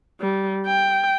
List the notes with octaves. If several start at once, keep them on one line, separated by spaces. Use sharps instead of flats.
G3
G5